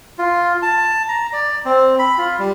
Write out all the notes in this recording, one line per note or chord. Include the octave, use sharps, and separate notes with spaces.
F4
A5
A#5
D5
C4
B5
F4
G3